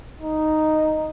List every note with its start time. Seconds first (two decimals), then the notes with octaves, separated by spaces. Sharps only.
0.21 D#4